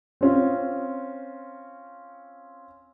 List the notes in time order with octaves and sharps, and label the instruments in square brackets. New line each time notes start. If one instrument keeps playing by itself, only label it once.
[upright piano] C4 C#4 F4